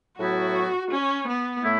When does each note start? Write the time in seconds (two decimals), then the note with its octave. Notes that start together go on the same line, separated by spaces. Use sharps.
0.17 A2 F#3 B3 E4 F#4
0.91 C#4
1.27 B3
1.64 A2 A3 E4